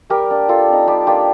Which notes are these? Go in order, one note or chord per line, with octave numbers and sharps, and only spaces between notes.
G3 G4 A#4
A#3 D4
G3 F4 A4
C4 D#4
G3 G4
A#3 D4 F4 G4